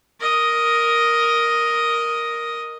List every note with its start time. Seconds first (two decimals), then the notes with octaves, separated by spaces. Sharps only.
0.20 A#4 D#5